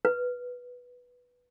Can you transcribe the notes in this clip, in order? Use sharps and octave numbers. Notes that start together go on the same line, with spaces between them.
B4